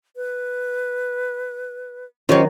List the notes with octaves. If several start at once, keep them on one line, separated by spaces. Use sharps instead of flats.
B4
D#3 F#3 C#4 F4 G4 C5 C#5 D#5